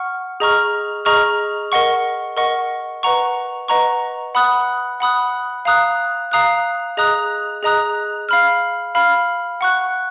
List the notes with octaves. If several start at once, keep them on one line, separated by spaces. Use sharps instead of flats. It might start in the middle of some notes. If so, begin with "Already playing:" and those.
Already playing: F#5 C#6 F6
G#4 D#5 A#5 C#6 F6
G#4 D#5 A#5 C#6 F6
A#4 D#5 F#5 C#6
A#4 D#5 F#5 C#6
B4 D#5 F#5 A#5 C#6
B4 D#5 F#5 A#5 C#6
F#5 B5 D#6 F#6
F#5 B5 D#6 F#6
F5 A#5 D#6 F#6
F5 A#5 D#6 F#6
G#4 D#5 A#5 D#6 F#6
G#4 D#5 A#5 D#6 F#6
F5 B5 F6
F5 B5 F6
F#5 C#6 F#6